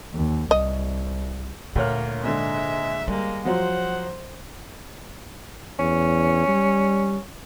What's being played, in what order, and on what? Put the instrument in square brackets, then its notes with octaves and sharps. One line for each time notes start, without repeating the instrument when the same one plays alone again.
[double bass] D#2
[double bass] C2 [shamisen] D#5
[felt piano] D2 C#5 F6 [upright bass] A#2 [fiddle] A#3
[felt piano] G#2 D3 [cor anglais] G#3 [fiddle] E5
[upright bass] G3 [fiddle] G#3 A#3
[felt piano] F3 F#3 [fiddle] C5 [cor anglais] F#5
[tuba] E2 [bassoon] C#4
[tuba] G3